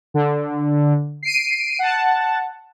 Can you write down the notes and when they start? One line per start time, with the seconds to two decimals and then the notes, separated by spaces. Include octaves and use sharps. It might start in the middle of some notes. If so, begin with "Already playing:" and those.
0.14 D3
1.23 C7 D7 D#7
1.79 F#5 A5